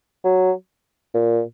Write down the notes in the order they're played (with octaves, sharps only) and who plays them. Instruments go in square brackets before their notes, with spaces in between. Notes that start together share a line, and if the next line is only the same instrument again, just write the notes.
[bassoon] F#3
A#2